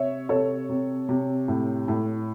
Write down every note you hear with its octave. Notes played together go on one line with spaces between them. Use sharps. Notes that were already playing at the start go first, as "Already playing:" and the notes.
Already playing: C3 C#5 E5
C3 A4 C#5
C3
C3
A2
A2